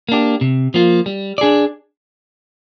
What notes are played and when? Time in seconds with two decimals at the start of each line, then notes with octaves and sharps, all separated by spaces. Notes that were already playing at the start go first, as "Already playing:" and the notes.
0.09 A#3 D4 G4
0.41 C3
0.74 F3 A#3 F4
1.06 G3
1.38 D4 G#4 D5